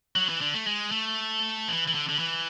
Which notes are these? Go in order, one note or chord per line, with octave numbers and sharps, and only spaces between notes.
F#3
E3
D3
A3
G#3
A3
E3
E3
D3
D3
E3